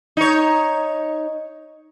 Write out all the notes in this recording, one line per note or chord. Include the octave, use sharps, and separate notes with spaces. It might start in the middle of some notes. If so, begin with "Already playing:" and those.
D#4 C#5